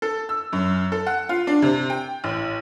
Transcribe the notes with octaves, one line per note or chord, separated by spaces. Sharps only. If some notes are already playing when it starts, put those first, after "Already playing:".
A4
E6
F#2
A4
F#5
F4
D4
C3
G5
A1